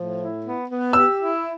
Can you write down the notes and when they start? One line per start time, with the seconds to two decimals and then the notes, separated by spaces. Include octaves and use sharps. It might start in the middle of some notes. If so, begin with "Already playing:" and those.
Already playing: A2 F3
0.18 E4
0.44 B3
0.69 B3
0.93 G4 E6
1.19 E4